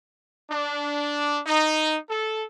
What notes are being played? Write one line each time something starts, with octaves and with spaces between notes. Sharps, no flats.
D4
D#4
A4